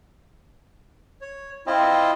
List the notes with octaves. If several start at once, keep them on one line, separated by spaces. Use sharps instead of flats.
C#5
C4 E4 F4 D#5